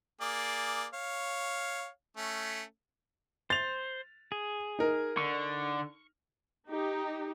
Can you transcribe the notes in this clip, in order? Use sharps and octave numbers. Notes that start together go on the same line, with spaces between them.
A#3 G#4 D5
C#5 F5
A3 C#4
C5 A6 F7
G#4
D#4 A#4
D3 C#6
D#4 G4